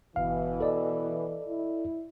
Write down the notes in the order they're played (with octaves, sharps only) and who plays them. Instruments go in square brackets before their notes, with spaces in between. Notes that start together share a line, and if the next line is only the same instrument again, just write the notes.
[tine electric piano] G1 F5 [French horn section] B2 E3
[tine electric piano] A4 D5 D#5
[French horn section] E4